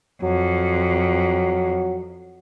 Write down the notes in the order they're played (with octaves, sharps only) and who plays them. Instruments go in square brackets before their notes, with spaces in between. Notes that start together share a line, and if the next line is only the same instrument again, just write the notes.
[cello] F2 [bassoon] F#3